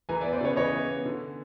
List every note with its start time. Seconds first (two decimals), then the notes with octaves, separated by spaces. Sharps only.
0.09 E3 G#5 A#5
0.21 D5 E5
0.25 B3
0.33 C5 D5
0.41 C#3 B4 C#5
0.56 E3 C#5 D#5
0.72 E3
0.89 B3
1.05 D3